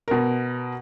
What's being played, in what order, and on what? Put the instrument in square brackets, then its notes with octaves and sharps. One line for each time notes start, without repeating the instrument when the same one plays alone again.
[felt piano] B2 A#4